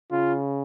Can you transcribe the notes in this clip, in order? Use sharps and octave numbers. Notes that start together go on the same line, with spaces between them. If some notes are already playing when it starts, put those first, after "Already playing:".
C#3 F4